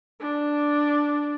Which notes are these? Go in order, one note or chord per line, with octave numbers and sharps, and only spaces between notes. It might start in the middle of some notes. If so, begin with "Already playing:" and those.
D4